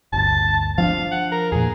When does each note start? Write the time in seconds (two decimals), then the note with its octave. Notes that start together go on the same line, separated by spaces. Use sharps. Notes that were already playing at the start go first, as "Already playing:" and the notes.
0.13 G1 D2 A5
0.78 F3 C4 D4 F5
1.12 F#5
1.32 A#4
1.52 E2 A#2 G#4